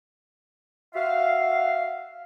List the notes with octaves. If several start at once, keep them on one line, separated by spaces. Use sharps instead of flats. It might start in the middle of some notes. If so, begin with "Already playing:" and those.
F#4 E5 F5